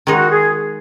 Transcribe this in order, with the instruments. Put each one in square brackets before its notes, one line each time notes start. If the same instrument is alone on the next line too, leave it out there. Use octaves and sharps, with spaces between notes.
[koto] D#3 G#3 D#4 [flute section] F#4
[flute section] G#4